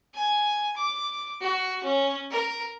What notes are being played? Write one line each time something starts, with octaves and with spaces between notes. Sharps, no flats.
G#5
D6
F#4
C#4
A#4